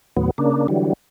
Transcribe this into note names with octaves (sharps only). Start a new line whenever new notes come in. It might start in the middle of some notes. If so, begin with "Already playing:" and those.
D#2 A2 F#3 B3
C#3 A#3 D4
D3 E3 F#3 G3